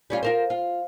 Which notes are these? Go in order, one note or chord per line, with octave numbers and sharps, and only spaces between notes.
G3 C#4 F4
F4 A#4 C5
F4